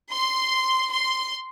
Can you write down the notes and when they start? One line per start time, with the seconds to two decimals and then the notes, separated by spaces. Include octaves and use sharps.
0.12 C6
0.92 C6